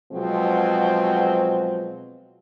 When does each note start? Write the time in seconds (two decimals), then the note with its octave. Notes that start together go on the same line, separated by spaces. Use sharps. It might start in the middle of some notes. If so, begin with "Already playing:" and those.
0.12 B2 F3 F#3 G#3 C4